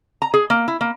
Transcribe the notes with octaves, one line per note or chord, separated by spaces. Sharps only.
A#5
G#4
A#3
E4
A#3